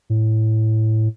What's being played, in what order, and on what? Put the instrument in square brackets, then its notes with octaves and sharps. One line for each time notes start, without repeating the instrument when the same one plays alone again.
[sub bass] A2